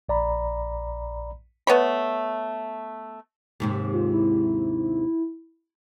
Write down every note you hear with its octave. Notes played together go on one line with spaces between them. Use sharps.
A#1 D5 A#5 B5
A3 B3 C#5 B5
D#2 G#2 C3
F4
E4